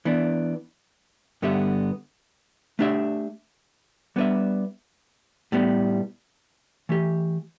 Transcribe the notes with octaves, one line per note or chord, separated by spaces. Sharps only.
E3 B3 D4
G2 D3 B3 G4 E5
A3 D4 G4 E5
G3 B3 D4 B4 E5
A2 G3 B3
E3 A3 G4